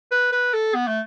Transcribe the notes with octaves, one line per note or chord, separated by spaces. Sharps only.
B4
B4
A4
B3
A3